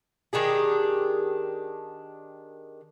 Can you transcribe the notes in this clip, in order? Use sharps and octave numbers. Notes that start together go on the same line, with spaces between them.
D#3 D4 G4 G#4